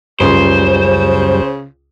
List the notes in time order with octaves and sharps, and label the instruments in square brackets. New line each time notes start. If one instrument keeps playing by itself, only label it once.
[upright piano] C#2 [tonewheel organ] F#2 G3 [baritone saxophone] C#3 [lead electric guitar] C5